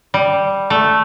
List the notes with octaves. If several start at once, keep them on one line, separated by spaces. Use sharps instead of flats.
G3
A3